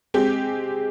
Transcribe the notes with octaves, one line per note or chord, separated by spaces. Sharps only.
G#3 C4 G4